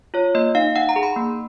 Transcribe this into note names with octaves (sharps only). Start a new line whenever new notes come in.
F4 C#5
A#3 D#5
D#4 F5
D#4 F#5
A#5
G#4
B5
A#3